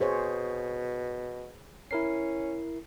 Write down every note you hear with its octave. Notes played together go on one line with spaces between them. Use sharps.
B2 G#4 C5 C#5
C#4 E4 A#4 C7